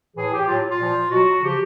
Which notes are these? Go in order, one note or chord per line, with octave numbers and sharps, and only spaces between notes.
A2 E3 G#4
G4
A2 F#3 F4
F4
A#2 F3
B2 F#3 F#4
C#3 F3 G4